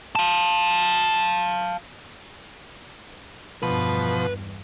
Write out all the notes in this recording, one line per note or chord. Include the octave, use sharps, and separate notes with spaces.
F5 A5
E2 G2 B2 F3 B4